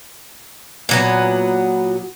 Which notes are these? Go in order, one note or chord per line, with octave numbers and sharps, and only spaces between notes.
A#2 F#3 B3